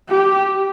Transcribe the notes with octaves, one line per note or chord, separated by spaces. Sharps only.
G4